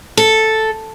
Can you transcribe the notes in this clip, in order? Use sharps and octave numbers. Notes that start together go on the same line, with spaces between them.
A4